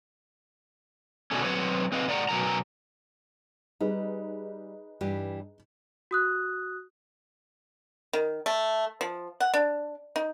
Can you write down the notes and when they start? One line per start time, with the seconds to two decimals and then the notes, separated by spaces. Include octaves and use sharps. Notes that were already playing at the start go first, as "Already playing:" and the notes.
1.31 B2 D3 A3 C#4
1.44 F#3 C4 B4 C#5
1.92 C4 B4 D#5 F5
2.08 A2 D5 F#5 A#5
2.29 B2 F#3 C#4 A#4 A#5
3.80 G3 D#4 G#4 B4
5.01 G2 E3 G4
6.11 F#4 D#6 F#6
8.13 D#3
8.46 A3
9.01 F3
9.40 F#5
9.54 D4
10.16 D#4